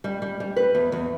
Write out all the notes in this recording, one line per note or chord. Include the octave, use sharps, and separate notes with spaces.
G3
G3
G3
B4
E2
E2